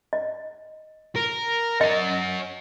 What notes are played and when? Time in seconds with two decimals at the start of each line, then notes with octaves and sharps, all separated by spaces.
0.13 D#5
1.16 A#4
1.81 C#4 D#5 F#5